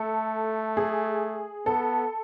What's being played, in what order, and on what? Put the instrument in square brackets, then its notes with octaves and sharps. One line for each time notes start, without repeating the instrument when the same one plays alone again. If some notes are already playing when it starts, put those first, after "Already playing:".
Already playing: [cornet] A3 [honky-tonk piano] A4
[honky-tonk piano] G#4
[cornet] B3 [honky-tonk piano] A4